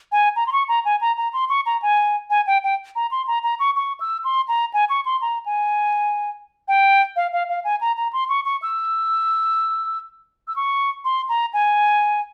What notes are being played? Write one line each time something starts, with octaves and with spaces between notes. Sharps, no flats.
G#5
A#5
C6
C#6
A#5
G#5
A#5
A#5
C6
C#6
A#5
G#5
G#5
G5
G5
A#5
C6
A#5
A#5
C#6
C#6
E6
C6
A#5
G#5
C#6
C6
A#5
G#5
G5
F5
F5
F5
G#5
A#5
A#5
C6
C#6
C#6
E6
E6
C#6
C6
A#5
G#5